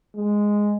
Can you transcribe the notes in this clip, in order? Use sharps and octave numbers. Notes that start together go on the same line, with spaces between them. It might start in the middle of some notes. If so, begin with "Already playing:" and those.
G#3